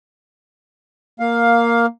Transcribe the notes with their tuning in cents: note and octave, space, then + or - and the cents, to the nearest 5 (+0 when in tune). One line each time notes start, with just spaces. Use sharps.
A#3 +0 F5 +10